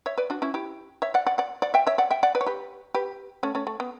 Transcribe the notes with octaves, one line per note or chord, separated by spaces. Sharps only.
C#5 E5
B4 D5
D4 F#4
C#4 E4
E4 G4
C#5 E5
D5 F#5
D5 F#5
D5 F#5
D5 F#5
E5 G5
C#5 E5
D5 F#5
E5 G5
D5 F#5
B4 D5
C#5
G4 B4
G4 B4
A3 C#4
A3 C#4
A3
B3